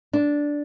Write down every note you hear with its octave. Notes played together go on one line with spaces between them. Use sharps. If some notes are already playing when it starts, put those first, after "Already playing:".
D4